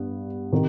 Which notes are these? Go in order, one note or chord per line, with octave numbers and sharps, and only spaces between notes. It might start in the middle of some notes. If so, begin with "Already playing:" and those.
Already playing: G2 B3
C3 D#3